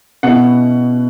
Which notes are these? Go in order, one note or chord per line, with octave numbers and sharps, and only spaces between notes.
B2 B3 E4 F#5